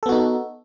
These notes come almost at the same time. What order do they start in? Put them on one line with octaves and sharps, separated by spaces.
A4 B3 F#4 D#4